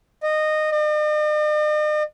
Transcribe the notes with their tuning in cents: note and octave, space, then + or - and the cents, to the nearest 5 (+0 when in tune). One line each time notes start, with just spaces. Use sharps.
D#5 -15
D#5 -45